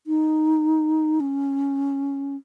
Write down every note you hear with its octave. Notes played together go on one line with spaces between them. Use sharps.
D#4
C#4